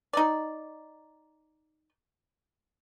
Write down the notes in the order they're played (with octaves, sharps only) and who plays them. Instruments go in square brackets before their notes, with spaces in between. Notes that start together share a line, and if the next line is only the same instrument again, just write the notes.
[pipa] D#4 D5